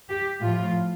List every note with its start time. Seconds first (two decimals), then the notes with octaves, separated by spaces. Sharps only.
0.09 G4
0.41 A2 F3 F4